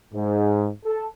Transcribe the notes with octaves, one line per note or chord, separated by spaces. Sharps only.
G#2
A4